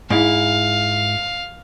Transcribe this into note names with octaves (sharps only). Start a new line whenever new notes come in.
G#2 E4 F5